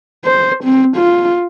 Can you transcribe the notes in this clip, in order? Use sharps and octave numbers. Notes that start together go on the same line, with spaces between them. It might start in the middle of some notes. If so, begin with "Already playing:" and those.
C5
C4
F4